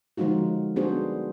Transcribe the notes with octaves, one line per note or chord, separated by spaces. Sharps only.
D3 F3 G#3 D#4 F4 F#4
G3 B3 D4 F#4 G#4 C5